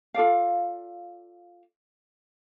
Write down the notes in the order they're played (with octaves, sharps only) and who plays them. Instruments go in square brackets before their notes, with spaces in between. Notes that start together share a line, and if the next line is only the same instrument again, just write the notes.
[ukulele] F4 A4 D5 F5